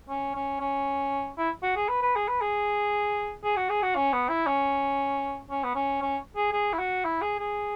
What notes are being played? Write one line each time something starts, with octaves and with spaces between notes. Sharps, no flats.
C#4
C#4
C#4
E4
F#4
G#4
B4
B4
G#4
B4
G#4
G#4
F#4
G#4
F#4
C#4
B3
E4
C#4
C#4
B3
C#4
C#4
G#4
G#4
E4
F#4
E4
G#4
G#4